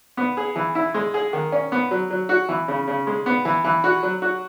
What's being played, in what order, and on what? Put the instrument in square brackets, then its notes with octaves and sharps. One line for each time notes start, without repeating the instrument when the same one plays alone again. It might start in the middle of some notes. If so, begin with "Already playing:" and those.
[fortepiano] B3
G#4
E3
E4
G#3
G#4
D#3
C#4
B3
F#3
F#3
F#4
E3
C#3
C#3
G#3
B3
E3
E3
F#4
F#3
F#4